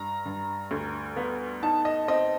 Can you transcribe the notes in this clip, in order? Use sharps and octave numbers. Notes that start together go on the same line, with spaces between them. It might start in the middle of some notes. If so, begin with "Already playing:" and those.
Already playing: G2 A#5
G2
D2
B3
D#4 A5
D#5
C4 D#5